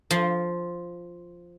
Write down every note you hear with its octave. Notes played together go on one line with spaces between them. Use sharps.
F3